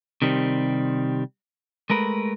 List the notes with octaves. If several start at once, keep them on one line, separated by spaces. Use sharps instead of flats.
C3 D#3 G3 C4
G#3 A3 A#4 B4